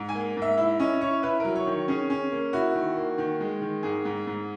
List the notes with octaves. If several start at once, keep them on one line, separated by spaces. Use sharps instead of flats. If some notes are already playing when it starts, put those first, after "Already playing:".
Already playing: G#2
G#5
A#3
G#2
E5
E4 E5
C#4 D#5
E4 C#5
E4 B4
F#3 A#4
C#5
D#3
C#5
C#4 G#4
C#4
A#3
E4 F#4
D#3
A#3
D#3
G#3
D#3
G#2 G#4
G#2
G#2